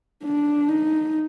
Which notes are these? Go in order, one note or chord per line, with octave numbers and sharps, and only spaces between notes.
D4
D#4